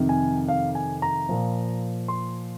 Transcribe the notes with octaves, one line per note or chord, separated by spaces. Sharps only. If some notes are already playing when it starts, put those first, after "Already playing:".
Already playing: F2 C3 D#3
G#5
F5
G#5
A#5
A#2 F3
C6